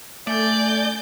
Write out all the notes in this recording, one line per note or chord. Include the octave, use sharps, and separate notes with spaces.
A3 D5 G#5 G6